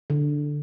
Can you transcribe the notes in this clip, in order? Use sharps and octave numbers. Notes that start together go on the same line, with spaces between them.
D3